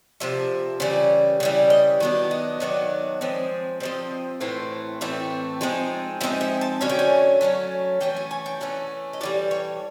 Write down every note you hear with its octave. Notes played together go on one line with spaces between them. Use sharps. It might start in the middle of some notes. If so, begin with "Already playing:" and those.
C3 F3 E5
C#3 E3 G3
C#3 E3 G3
D#5
D#3 F#3 B3 D4
D#5
D#3 F#3 B3 D4
F3 G#3 C4
F3 G#3 C4 D#5
A2 E3 A3 C4
A2 E3 A3 C4 E5
F3 G#3 C4 D#4
F3 G#3 C4 D#4 E5
E5
A5
D3 F#3 A3 C#4 G#5
G5
G#5
D3 F#3 A3 C#4
E3 A3 C#4 G5
G#5
G#5
G5
E3 A3 C#4 F#5
D#5
A2 E3 G3 D5
C#5